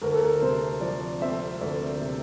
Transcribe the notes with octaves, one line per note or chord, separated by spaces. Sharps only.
D2 A#4
A4
A#4
C3 C5
F3 D5
C4 E5
D2 D5
C3